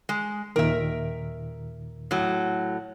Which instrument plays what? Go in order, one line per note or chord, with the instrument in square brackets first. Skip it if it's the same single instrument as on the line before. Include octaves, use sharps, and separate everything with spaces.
[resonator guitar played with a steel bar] G#3
[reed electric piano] D#2 A#2 D#3 [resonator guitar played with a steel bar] A#4 E5
[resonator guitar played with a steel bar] A2 F#3